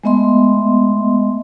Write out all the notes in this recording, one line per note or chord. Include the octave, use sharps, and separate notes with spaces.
G#3 A3 B3 D#5 E5 C6